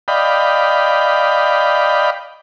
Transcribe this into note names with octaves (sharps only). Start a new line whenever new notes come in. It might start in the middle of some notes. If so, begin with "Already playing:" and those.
D5 D#5 F5 G5 B5